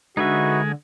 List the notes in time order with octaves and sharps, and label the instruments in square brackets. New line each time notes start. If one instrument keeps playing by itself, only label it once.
[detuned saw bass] D3 [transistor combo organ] G#3 [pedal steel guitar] D#4 B4 E5 [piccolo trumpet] F#4